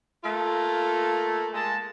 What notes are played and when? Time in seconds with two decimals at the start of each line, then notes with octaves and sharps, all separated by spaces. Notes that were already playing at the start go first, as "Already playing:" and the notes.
0.24 A3 A#3 F4 A4
1.53 G#3 A#3 A5